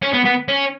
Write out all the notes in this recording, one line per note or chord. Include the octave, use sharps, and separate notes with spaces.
C#4
B3
B3
C#4